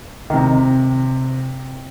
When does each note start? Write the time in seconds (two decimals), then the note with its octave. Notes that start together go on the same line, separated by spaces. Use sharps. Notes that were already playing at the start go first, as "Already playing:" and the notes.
0.30 D#3
0.34 C3